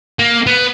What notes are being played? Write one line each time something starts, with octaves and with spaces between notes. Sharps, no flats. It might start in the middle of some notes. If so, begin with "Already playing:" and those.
A#3
B3